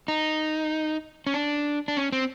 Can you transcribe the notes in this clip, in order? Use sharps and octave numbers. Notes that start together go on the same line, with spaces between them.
D#4
C#4
D4
D4
C#4
C4